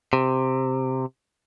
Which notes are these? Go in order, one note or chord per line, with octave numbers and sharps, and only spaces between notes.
C3